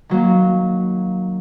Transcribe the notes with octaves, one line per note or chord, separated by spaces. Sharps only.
D#3 F#3 A#3